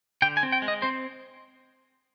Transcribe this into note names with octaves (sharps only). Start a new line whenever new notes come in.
D3 G5
G#5
C4
G5
G#3
D#5
C4 C5